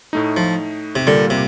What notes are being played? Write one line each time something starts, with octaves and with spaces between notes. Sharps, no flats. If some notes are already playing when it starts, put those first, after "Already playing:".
A2 A3 D#4
F3
C3
A#2 D3 G3 A#3
C3